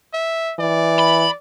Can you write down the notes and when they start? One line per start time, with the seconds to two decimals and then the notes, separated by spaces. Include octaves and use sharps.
0.13 E5
0.59 E3 D5
0.98 B5